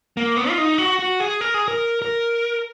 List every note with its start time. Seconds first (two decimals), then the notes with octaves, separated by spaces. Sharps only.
0.17 A#3
0.37 B3
0.49 F4
0.58 D#4
0.78 F#4
0.99 F#4
1.20 G#4
1.41 A#4
1.54 G#4
1.68 A#4
2.02 A#4